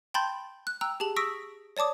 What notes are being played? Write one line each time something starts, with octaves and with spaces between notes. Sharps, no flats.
G5 A5 B5 C6 G6 A6
F#6
G5 A#5 E6 F#6
G4 G#4 A5 F#7
C#6 D#6 E6 A#6 B6 D7
C#5 D5 A5 D6 D#6